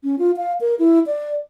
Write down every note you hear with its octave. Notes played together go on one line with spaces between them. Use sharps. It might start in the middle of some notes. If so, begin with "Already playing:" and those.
C#4
F4
F5
A#4
E4
D5